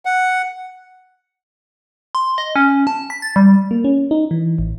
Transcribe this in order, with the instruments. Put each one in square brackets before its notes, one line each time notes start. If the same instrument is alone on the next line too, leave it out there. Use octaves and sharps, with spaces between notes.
[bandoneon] F#5
[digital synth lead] C6
D#5
C#4
A5
B6
A6
G3
[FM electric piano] A#3
C#4
D#4
E3
A1